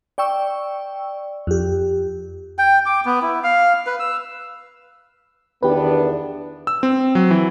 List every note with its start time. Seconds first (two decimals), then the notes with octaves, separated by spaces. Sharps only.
0.18 D5 G5 C#6 E6
1.47 F2 G4
2.59 G5
2.86 D6
3.05 B3
3.22 E4
3.44 F5
3.86 B4
4.00 E6
5.63 E2 D#3 B3 D4 G4 B4
6.67 E6
6.83 C4
7.15 F#3
7.31 E3